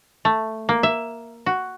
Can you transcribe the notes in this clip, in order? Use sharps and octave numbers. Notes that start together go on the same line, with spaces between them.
A3
A#3
E5
F#4